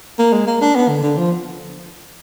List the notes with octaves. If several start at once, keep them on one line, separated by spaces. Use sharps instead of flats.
A#3
G#3
A#3
D4
B3
D3
D3
F3